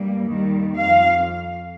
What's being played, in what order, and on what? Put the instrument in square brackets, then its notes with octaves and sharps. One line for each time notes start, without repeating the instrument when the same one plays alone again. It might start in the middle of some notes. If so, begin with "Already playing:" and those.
Already playing: [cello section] G2 G3 A#3
D#2 D#3 G3
F2 F5